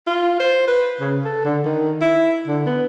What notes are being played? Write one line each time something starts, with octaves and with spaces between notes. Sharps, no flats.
F4
C5
B4
C#3
A4
D3
D#3
E4
D3
B3